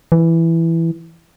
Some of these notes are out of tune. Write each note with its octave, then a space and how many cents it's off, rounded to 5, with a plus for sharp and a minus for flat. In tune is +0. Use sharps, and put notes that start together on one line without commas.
E3 +5